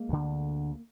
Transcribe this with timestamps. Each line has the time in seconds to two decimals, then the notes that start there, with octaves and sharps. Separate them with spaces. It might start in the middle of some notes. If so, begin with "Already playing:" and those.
Already playing: G#3 A#3
0.09 D2 D3